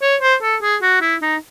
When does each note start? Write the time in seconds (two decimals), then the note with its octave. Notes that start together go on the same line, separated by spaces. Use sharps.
0.02 C#5
0.21 C5
0.42 A4
0.62 G#4
0.82 F#4
1.01 E4
1.22 D#4